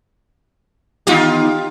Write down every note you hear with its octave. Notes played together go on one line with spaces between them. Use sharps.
D#3 E3 B3 D#4 F4 G4